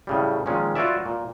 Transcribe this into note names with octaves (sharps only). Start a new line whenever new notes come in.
A2 C#3 G3
A#2 D#3 F3 G#3 C#4 G#4
F4 F#4 B4 C#5 D5 E5
A#2